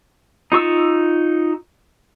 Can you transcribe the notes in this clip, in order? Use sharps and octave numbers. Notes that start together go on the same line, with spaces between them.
D#4 F4 C#6 E6